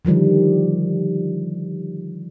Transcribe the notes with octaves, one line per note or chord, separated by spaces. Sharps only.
D3 D#3 F3 G3